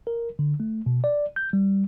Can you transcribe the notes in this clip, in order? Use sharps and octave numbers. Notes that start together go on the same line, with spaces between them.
A#4
D3
A3
B2
D5
G6
G3